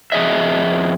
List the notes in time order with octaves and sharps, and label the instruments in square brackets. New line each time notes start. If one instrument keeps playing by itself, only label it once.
[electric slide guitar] F2 G#4 D#5 E5